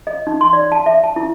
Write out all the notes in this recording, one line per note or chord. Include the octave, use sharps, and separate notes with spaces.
D#5
D#4
C6
D5
A5
E5
A5
E4